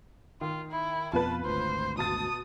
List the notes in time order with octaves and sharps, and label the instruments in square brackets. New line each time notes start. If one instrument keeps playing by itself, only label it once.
[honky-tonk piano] D#3 [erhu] F4
[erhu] E4
[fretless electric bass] F2 B2 B3 [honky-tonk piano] F4 B4 [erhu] A5
[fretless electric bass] G#1 D2 [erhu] C5
[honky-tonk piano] B2 A5 A6 [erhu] D#6